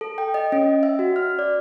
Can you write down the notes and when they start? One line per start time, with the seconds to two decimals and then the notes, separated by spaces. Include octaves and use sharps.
0.01 A4
0.18 G5
0.34 D#5
0.52 C#4
0.83 E5
0.99 F#4
1.16 F6
1.39 D5